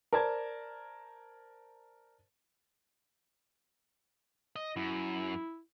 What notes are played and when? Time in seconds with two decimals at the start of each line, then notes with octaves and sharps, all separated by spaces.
0.13 A#4 C5 D5 A5 G#6
4.56 D#5
4.76 F#2 E4